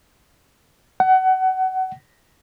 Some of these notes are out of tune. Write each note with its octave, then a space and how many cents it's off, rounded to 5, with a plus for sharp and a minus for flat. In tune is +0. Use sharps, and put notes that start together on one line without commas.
F#5 +25